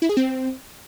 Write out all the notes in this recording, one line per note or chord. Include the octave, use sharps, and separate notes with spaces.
E4
G#4
C4